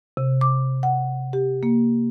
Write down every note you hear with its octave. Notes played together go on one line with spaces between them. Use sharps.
C3
D6
F#5
G4
A#3